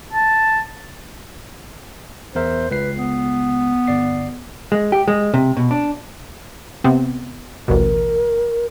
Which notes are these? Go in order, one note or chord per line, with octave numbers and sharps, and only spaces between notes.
A5
E2 A#4 C5 E5
C#2 B4 C7
B3
G1 D5 C7
G#3
G4
G#3
C3
B2
D4
C3 B3 C4
A1 D2 B2 A#4